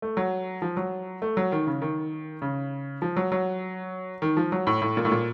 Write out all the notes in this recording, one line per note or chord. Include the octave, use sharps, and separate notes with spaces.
A3
F#3
F3
F#3
A3
F#3
D#3
C#3
D#3
C#3
F3
F#3
F#3
D#3
F3
F#3
A2
A2
A#2
A2
A#2